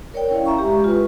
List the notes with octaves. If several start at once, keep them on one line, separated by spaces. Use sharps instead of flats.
A#4 C#5 D5 G5
C#4 E4 F5
E5 A#5 C#6
G#3 G4
F4 B4